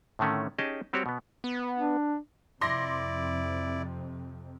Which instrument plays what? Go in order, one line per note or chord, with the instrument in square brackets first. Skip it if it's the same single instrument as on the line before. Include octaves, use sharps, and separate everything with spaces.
[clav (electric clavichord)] A2 D3 D#3 A3 C#4
C#4 D#4 G4 G#4 D#5 A5
G3 C4 F#4 G4 C#5
B2 B3
[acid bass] B3
[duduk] D4
[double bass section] F2 C3 [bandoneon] E4 D5 [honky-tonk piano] C6 D6 A#6